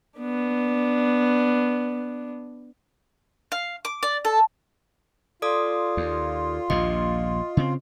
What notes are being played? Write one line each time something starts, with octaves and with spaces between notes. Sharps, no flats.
B3 D4
F5
D6
D5
A4
F4 A4 D5 D#6
D#2
A#1 D#2 A#2 D#5
C#3 C4